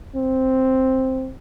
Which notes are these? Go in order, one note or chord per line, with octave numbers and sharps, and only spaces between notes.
C4